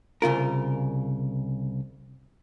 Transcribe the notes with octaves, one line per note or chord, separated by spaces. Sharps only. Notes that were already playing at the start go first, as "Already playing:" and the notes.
C2 C#3 F4 A#4